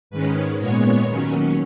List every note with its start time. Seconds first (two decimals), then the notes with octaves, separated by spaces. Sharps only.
0.11 G#2 D#3 G#3 C#4 B4
0.59 A#2 G#3 B3 C#5
1.06 D#2 D#3 F#3 C#4